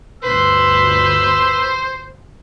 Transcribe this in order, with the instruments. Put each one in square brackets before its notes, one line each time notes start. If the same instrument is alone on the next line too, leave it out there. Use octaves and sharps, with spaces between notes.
[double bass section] G1 D2 [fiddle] B4 C6 [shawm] C5 [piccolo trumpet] E6